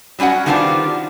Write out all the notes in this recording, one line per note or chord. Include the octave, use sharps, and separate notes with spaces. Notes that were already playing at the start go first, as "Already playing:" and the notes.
F#3 G3 C#4 F#4 F#5
D#3 G3 B3 C4 D4 F4